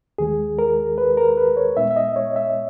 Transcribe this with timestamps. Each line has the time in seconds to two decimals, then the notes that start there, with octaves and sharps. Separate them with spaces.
0.18 D#2 D#3 G#3 G#4
0.59 A#4
0.98 B4
1.17 A#4
1.37 B4
1.57 C#5
1.77 A#2 G#3 B3 D#4 E5
1.91 E5
1.96 D#5
2.16 C#5
2.36 E5